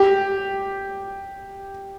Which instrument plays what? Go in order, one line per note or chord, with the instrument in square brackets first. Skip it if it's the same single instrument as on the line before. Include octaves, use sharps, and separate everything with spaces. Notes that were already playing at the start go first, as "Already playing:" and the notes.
Already playing: [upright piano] G4